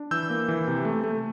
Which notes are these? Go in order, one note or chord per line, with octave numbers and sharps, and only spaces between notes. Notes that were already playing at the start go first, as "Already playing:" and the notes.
Already playing: D4
E3 E6 G6
A#3
E3
C3
A3
A3